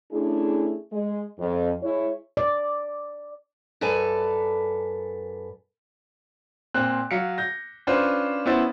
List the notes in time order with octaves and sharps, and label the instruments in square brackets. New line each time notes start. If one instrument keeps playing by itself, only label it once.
[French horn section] A3 C#4 D4 E4 G#4
G#3
F2
G#3 E4 C#5
[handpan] D5
[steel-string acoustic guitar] F#2 A4 B4 D5 G#5
[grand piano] A#2 C4 F#6
F#3 F5 B6 C#7
G6 A#6
C#4 D4 F4 B4 C5
B3 C#4 E4 C5 A6